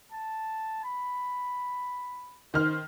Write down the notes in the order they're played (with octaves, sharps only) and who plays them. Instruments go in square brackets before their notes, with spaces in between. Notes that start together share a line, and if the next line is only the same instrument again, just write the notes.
[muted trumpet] A5
B5
[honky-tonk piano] D#3 F6 [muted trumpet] C5